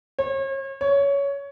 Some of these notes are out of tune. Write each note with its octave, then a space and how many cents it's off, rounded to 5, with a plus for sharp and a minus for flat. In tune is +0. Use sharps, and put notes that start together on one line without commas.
C#5 -40
C#5 +15